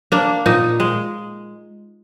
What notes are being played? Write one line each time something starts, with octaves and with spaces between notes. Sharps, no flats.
A#3 D4
A#2 D#4
G#3